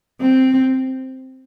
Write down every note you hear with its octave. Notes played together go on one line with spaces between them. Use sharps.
C4